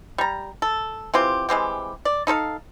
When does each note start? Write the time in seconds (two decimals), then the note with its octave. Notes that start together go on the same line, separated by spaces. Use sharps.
0.18 G3 A#5
0.62 A4
1.14 E3 C4 F4 G4
1.49 E3 G#3 C4 G4
2.05 D5
2.27 D#4 A4 C5 F5